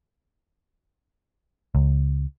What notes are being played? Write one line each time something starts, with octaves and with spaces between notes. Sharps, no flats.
C#2